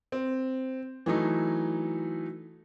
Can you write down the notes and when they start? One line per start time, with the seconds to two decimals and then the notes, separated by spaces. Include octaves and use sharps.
0.12 C4
1.06 E3 F#3 A3 D#4